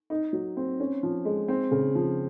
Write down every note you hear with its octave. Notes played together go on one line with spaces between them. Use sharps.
D#4
F#3
C4
C#4
F3
G#3
C4
C#3
F3